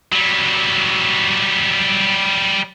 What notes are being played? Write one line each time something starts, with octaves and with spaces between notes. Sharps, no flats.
F#3 G3